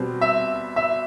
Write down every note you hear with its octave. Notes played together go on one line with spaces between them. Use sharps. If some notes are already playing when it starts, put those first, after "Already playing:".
Already playing: B2 G3 C4
E5
E5